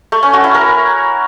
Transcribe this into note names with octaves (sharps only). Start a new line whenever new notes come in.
A3
C#4
F#4
E4
A#4